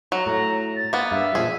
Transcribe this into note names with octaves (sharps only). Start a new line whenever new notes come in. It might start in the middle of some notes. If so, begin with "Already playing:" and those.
F#3 A#5
A2 A#5
A6
A#3 B3
G2 E5 F5
A#2 F3 G#4